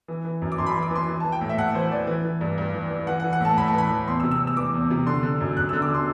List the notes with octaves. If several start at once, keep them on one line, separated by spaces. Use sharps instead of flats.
E3
E3
F#2
D6
F#2 C6
B5
C6
E3
D6
E3 C6
E3
A5
E3
G5
A2
E5
A2 F#5
E3 C5
E3 D5
E3
E3
G2
G2
E3
E3
E3 F#5
F#5
E3
F#5
A2 A5
A2 B5
A5
E3 B5
E3
E2 C6
E6
C3
E6
E2
E6
E3 D6
E2
C3
D3 C6
D3
F#2
F#2 F#6
D3 E6
D6
D3 C6